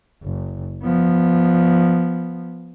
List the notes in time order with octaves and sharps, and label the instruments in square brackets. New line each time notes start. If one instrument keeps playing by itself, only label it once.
[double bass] F#1
F3 B3